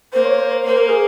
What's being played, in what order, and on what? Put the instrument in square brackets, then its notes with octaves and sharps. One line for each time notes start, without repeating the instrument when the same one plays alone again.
[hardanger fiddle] A#3 [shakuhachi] C5
[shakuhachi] C#5
C5
[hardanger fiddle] A#3 [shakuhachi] C5
[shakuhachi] A#4
G#4